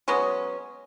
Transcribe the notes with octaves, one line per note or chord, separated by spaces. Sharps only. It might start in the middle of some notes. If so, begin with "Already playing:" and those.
F#3 G#3 B3 C#4